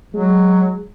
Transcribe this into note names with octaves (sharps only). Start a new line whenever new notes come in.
F#3 G#3